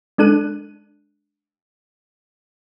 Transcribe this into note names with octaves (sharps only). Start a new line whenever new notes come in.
G#3 D4 A4 F#6 D#7